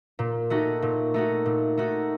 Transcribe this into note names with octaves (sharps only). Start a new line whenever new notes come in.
A#2
A3 D#4 F#4
A#2
A3 D#4 F#4
A#2
A3 D#4 F#4